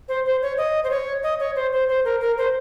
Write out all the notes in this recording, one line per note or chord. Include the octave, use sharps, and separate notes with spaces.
C5
C5
C#5
D#5
C5
C#5
D#5
C#5
C5
C5
C5
A#4
A#4
C5